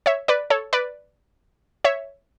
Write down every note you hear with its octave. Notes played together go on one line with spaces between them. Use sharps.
C#5 E5
B4 D5
A4 C#5
B4 D5
C#5 E5